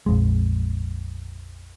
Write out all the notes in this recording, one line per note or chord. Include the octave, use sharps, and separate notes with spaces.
A#1 F2 G#3